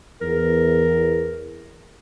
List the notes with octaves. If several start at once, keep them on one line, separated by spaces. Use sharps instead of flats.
E2 A#4